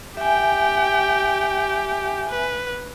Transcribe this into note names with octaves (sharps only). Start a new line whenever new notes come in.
G4 E5 G5 G#5
B4